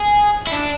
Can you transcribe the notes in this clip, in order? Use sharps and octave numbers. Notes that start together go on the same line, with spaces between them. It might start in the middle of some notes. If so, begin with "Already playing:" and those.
Already playing: G#4
E4
D4